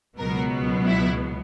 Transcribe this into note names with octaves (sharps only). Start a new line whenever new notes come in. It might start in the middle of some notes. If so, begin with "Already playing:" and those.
C#2 B2 F#3 B3 A#4
E4